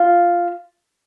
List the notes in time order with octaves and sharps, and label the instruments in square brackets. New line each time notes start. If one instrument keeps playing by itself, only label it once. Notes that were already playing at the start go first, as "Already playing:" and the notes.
Already playing: [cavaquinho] F4